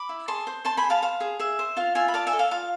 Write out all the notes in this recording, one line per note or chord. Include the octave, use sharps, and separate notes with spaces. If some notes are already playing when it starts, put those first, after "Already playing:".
Already playing: B5 D6
E4
G#4 A5 C6
C5
C5 A5 C6
G#5 B5
G#4
F5 A5
C5 F5
G#4
G#4 E5
C5
F4 F5
F4 E5 G#5
B5
D5 F5 A5
E5 G#5
A4
F5
F4 F5